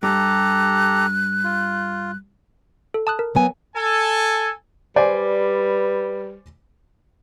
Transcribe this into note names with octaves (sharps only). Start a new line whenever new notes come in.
G2 G4 A4 A#5 F#6
F4
A4
A5 D#6 F#6
A#4
F#3 B3 G#5
A4 G#5
G3 B4 C5 D5 G#5